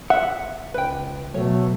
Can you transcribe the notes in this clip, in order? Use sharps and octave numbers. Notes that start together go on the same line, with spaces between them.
E5 F#5
C#2 B4 G5
B2 F#3 A3 C#5